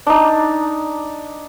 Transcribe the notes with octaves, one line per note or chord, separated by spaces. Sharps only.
D4 D#4